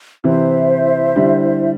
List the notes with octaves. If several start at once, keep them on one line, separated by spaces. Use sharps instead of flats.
C3 E3 E4 C5 E5
D3 G3